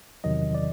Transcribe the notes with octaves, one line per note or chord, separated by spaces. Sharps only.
E2 C3 D#3 F#3 D#5
D5